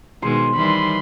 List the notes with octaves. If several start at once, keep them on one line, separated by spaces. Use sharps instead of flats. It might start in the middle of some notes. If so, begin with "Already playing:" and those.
B2 D#3 G#3 C5
D#3 E3 G3 B5 C6